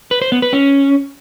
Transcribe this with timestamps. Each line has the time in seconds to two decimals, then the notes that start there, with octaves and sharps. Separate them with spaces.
0.11 B4
0.22 C5
0.32 B3
0.42 B4
0.53 C#4